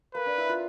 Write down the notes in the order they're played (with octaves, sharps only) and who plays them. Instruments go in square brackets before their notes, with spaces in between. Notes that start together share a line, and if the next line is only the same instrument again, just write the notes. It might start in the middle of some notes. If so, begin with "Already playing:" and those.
[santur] A#3 [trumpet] B4
[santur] D4
E4
F4